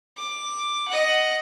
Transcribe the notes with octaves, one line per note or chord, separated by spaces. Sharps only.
D6
D#5 F#5